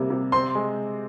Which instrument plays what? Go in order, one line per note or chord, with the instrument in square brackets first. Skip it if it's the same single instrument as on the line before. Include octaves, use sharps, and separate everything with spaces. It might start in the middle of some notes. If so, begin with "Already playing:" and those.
Already playing: [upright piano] C3 G3 A#3
C3
[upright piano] C4 [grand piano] C6
[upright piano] G#3